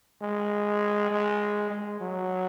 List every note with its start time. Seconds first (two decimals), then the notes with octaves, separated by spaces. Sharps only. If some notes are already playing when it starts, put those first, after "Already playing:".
0.22 G#3
1.11 G#3
1.70 G#3
2.00 F#3